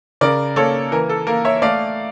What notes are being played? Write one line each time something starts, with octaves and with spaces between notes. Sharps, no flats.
C#3 A#4 D5
A#3 A4 C#5
E3 A#4
A4
A#3 A#4
C#5 E5
A3 D5 F5